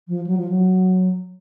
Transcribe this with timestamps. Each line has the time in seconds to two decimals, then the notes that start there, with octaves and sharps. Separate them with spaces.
0.08 F3
0.27 F#3
0.37 F3
0.49 F#3